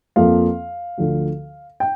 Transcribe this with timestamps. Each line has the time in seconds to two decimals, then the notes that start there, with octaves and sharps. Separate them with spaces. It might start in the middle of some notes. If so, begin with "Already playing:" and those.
0.16 F2 F3 A#3 F5
0.98 D2 D3 F3
1.80 G5